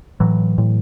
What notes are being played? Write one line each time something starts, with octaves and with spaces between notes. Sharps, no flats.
A2 E3 F#3
A2